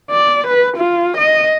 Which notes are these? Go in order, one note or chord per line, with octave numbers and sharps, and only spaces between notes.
D5
B4
F4
D#5